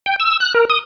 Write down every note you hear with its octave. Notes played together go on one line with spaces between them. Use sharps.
G5
E6
F#6
A#4
D#6